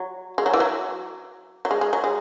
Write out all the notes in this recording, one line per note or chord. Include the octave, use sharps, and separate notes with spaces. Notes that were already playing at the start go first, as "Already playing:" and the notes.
Already playing: F#3
G#3
F#3
E3
F#3
F#3
G#3
G#3
F#3
G#3